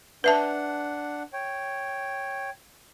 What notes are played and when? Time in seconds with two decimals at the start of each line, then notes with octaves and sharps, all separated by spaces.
0.24 D4 B4 E5 F#5 A5
1.33 C#5 G5